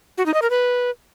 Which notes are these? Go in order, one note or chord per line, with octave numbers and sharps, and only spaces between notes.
F#4
D#4
D#5
A#4
B4